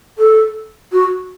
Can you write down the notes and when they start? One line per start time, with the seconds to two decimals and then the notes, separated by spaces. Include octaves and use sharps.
0.18 A4
0.92 F#4